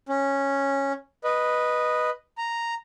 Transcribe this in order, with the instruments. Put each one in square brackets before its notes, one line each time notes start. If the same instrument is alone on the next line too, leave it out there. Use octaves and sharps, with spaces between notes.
[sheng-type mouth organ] C#4
B4 D#5
A#5